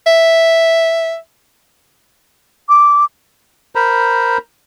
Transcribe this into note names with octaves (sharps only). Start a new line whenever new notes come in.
E5
D6
A#4 C5 A#5 B5